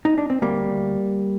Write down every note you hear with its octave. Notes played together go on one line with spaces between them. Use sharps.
D#4
D4
C4
D2 G3 A#3
D2